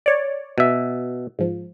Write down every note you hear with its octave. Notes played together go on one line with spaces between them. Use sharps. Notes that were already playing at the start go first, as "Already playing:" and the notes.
C#5 D5
B2 E5
G#2 F3